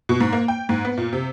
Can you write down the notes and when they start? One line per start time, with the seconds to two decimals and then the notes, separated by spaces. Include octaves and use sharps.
0.09 B2
0.20 G#2
0.32 A#3
0.48 G5
0.69 G#2
0.85 B3
0.97 A#2
1.13 C3